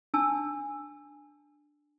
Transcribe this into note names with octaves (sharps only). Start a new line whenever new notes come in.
D4 G#5 A5 E6